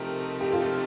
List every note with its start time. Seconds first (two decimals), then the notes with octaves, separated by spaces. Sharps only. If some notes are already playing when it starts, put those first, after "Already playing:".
Already playing: C3 F3 A3 D#4 G4 A#4
0.41 G4
0.52 F4 A4